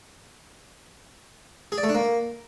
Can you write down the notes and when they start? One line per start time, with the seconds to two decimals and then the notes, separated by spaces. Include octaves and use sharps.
1.72 G#4
1.78 D5
1.83 A3
1.89 D4
1.95 A#3